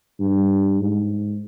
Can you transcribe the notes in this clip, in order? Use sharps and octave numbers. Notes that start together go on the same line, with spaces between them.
G2
G#2